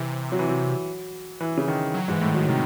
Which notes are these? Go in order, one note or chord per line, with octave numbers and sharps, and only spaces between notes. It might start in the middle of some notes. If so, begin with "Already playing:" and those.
Already playing: C3 E3
F#3
E3
F#3
E3
C#3
D#3
F#3
G#2 E3
A2
D#3 F#3
C3 D#3